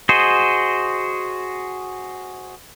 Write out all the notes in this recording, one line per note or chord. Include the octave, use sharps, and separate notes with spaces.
F#4 G#4 C5 D#5